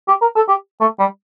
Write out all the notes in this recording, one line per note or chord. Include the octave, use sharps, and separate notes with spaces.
G4
A#4
A4
G4
A3
G3